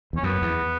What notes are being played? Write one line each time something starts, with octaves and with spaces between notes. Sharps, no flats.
E2 C#4
F#2 B3
E2